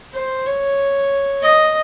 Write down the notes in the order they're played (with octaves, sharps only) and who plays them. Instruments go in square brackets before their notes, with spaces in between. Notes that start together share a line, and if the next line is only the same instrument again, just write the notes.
[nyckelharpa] C5
C#5
D#5